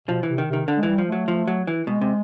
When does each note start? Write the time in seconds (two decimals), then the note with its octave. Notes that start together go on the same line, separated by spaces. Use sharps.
0.08 B2 F3
0.23 E3
0.28 C3
0.38 D#3
0.48 C3 D#3
0.68 D3
0.77 G#3
0.83 E3 G3
0.98 F3
1.08 F#3 A3
1.28 F3
1.48 F#3
1.67 E3
1.87 B2 G#3
2.01 C3